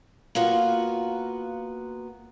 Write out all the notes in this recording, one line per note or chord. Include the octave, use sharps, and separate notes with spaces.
A#3 B3 F4 F#4